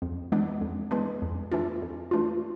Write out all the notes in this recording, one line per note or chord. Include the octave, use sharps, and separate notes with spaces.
F2
E3 G#3 B3 D4
F2
E3 G#3 B3 D4
F2
E3 A3 D4 F4
F2
E3 A3 D4 F4